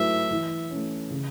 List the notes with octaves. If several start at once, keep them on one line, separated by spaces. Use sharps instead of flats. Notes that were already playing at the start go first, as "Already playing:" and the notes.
Already playing: G#2 F#3 A3 E4 B4 E5
E3
A3 C#4
C#3